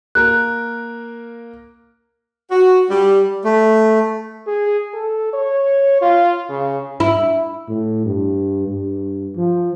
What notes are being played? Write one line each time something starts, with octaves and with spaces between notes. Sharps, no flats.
A#3 A#4 F#6
F#4
G3
A3
G#4
A4
C#5
F4
C#3
E4
A2
G2
G2
F3